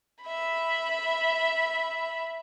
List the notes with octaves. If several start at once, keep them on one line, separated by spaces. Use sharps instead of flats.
E5 B5